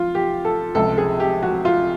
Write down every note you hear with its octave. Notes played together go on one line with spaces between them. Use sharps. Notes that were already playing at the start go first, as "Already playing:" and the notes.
Already playing: F3 F4
G4
A4
C#2 C3 F3 A4
G#4
G4
F#4
F4